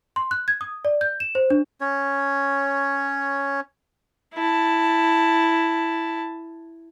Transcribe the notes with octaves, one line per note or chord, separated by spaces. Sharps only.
C6
F#6
G#6
D#6
D5
G6
E7
C5
D4
C#4 C#5
E4 A5